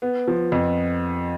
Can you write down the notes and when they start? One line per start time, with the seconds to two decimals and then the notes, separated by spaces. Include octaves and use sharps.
0.02 B3
0.27 F3
0.52 F2